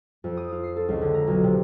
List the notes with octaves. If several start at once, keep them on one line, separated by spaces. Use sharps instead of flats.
F2
D#6
F4
C7
A4
C#2
D3
A#5
B1
C3